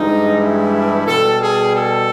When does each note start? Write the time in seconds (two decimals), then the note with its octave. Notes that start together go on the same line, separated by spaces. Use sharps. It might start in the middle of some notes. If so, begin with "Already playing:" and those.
Already playing: G2 E3 G#3 D#4
0.39 E4
1.07 B2 G3 A4
1.41 G#4
1.75 A4